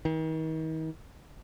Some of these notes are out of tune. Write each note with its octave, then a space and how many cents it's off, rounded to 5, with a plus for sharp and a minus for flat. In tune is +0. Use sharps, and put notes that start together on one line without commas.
D#3 +40